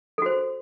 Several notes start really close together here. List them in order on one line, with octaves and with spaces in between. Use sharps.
A4 F#4 C5